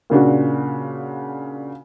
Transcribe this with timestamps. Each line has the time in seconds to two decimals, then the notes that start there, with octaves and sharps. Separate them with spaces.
0.10 A#2 C#3 D4 F#4